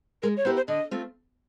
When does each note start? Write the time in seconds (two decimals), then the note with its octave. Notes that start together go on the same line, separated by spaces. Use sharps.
0.23 G#3 A#4
0.37 C#5
0.45 B3 E4 G4 A#4 C5
0.56 C5
0.68 D3 D#5
0.91 A3 C4 F4